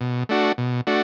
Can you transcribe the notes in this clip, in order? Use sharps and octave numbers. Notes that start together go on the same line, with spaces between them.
B2
A3 D4 F#4
B2
A3 D4 F#4